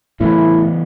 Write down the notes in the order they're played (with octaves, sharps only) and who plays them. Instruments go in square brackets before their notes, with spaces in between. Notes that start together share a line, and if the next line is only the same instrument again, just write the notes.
[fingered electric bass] A2 [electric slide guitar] E3 B3 C#4 [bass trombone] E4